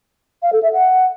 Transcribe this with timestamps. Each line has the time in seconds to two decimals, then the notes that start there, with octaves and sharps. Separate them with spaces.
0.43 F5
0.53 A4
0.63 E5
0.73 F#5